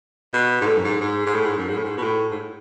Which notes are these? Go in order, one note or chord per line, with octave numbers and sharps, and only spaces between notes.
B2
G#2
A2
F#2
G#2
G#2
G#2
A2
G#2
F#2
G#2
A2
G#2
B2
A2
G#2